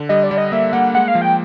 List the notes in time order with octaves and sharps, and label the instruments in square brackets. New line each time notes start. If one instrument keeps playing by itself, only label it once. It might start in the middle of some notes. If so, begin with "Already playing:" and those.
Already playing: [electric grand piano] D3
[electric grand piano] G3 [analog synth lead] D#5
[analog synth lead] D5
[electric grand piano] G3
[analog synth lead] D#5
[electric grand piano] A#3 [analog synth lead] E5
[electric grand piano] A#3 [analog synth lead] F#5
[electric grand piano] G#3 [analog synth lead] F#5
[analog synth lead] F5
[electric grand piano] F3
[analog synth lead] G5